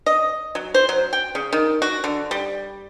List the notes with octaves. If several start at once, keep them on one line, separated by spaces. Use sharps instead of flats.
D#5
F#3
C5
F#3
G5
C#3
D#3
F#4
D3
G3